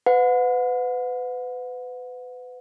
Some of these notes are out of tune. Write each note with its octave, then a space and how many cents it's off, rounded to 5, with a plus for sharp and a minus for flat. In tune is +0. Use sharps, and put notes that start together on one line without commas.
B4 +30 F#5 -35